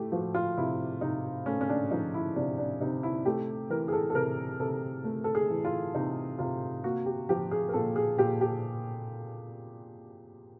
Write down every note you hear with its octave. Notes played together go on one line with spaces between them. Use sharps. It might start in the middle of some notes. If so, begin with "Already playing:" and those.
Already playing: A3 E4 G4
F3 F#4
F4
C3 E4
C3 D#4
A3 C#4
C#4
D4
F3 D#4
E4
C3 D4
D4
C3 D#4
E4
A3 G4
E3 A#4
G#4
A4
A4
C3 A#4
C3 A4
A3
A4
G#4
E3
F4
C3 D#4
C3 F4
A#3 F#4
G4
F3 G4
G#4
A#4
A#2 A4
G#4
A#2 G4
G4